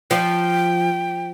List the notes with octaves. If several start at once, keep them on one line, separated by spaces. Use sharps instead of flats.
F3 G5